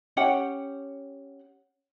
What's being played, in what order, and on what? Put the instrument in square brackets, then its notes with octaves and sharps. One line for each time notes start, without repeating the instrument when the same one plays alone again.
[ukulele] C#4 G4 F#5 G5